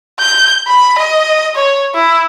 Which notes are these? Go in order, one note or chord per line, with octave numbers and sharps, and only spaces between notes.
G6
B5
D#5
C#5
E4